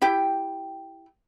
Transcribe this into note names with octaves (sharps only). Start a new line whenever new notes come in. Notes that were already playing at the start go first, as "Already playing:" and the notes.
E4 G4 G5